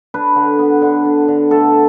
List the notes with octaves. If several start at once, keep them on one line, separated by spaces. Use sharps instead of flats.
D4 B4
D3
B3
D3
D4
D3
A3 A4